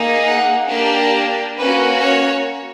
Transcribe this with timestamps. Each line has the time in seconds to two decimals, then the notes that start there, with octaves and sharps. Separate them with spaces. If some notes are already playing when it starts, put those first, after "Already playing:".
Already playing: A#3 D#4 G#4
0.26 F#5
0.70 A#3 D4 G4
1.58 A#3 C#4 F#4 B4
2.02 C#5